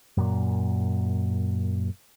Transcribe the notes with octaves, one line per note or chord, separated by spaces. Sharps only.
F#2 A#2